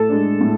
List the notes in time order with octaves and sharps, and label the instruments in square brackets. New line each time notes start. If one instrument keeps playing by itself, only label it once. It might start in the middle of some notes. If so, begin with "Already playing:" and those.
Already playing: [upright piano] A2 [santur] A4
[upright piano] G#3 D4
A2